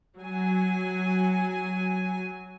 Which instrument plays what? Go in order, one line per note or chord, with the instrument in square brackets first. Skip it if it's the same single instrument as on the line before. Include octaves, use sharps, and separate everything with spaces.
[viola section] F#3 G#5